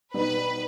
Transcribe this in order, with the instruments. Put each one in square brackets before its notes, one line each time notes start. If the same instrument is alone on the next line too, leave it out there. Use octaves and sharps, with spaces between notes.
[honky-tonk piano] B2 G3 B3 D#4 [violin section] B4